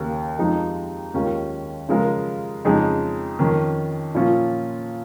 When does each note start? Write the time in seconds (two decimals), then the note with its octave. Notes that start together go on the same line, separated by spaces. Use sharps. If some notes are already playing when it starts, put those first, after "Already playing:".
Already playing: D#2 C#3 A#3 C#4
0.39 F2 F3 G#3 D#4
1.14 D#2 D#3 G#3 C#4 F4
1.89 C#3 F3 G#3 F4 A#4
2.65 F2 C#3 G#3 D#4 G#4
3.39 F2 D#3 C#4
4.15 A#2 F3 C#4 F4